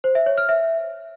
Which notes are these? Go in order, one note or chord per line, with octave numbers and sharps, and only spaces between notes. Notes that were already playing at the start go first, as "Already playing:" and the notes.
C5
E5
C#5
F6
E5